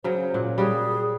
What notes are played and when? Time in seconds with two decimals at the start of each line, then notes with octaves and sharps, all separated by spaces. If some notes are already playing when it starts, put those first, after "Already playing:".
0.04 C#3 F#3 C5
0.34 A#2 F#5
0.58 G3 F#4 G#4 C#5